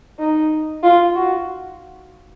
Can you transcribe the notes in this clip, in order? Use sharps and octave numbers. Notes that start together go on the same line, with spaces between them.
D#4
F4
F#4